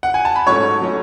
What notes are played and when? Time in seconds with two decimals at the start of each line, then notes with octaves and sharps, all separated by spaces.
0.03 F#5
0.14 G#5
0.25 A5
0.36 B5
0.47 G#2 F#3 A3 C#4 C#5 C#6
0.82 F#3 A3 C#4